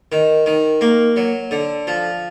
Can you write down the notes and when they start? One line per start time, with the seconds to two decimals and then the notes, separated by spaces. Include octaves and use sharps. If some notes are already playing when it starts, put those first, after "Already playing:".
0.12 D#3
0.46 D#3
0.81 A#3
1.16 F#3
1.51 D3
1.87 F3